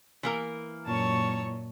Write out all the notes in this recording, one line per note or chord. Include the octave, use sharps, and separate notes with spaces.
E3 A#3 A#4
F#2 A#2 C#5 A5 C#6